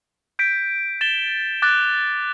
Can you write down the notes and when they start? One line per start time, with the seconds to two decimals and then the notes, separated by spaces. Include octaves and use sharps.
0.39 G6 B6 D7
1.01 A6 E7 G7
1.62 D6 F#6 A6